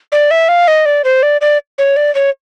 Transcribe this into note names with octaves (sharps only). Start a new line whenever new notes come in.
D5
E5
F5
D#5
D5
C5
D5
D5
C#5
D5
C#5